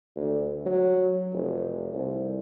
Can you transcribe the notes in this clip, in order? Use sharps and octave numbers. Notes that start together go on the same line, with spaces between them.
D2
F#3
F1
C2